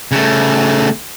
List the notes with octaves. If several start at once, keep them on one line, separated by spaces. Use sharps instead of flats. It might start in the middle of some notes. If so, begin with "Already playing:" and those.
C#3 A3